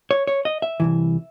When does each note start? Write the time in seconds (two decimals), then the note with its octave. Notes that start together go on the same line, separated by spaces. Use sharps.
0.11 C#5
0.27 C#5
0.45 D#5
0.62 E5
0.80 C2 C3 E3